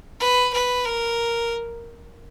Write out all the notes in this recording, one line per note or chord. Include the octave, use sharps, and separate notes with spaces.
B4
B4
A#4